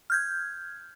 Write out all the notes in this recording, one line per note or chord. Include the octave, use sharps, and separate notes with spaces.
F6 G6 G#6